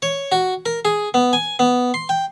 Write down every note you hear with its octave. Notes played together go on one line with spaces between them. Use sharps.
C#5
F#4
A#4
G#4
B3
G#5
B3
C6
G5